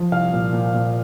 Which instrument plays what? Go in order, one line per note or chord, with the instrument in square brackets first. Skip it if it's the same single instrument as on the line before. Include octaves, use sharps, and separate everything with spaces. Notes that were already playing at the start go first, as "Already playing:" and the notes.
Already playing: [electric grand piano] F3
C2 F5
A#2
A#2
A#2